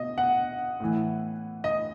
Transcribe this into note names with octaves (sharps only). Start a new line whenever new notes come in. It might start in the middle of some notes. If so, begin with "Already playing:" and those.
Already playing: B2 D#5
F#5
A2 E3
D#5